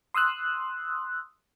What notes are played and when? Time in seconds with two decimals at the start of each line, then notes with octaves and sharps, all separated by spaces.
0.14 C6 D#6 E6 F#6